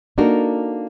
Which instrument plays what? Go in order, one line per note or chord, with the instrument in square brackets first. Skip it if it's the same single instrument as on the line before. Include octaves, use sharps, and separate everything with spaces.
[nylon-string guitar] A#3 D4 D#4 F#4 A4 A#4